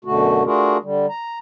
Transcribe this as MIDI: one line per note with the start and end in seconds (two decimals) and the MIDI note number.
0.05 0.45 42
0.05 0.45 47
0.05 0.45 50
0.05 0.45 57
0.05 0.45 66
0.45 0.77 57
0.45 0.77 62
0.45 0.77 65
0.45 0.77 66
0.45 0.77 68
0.45 0.77 70
0.82 1.06 50
0.82 1.06 55
1.09 1.39 82